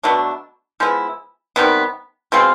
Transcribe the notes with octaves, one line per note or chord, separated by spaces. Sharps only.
B2 F#3 A3 D4
F3 G#3 B3 E4
C3 D#3 G3 B3
B2 G#3 C4 F4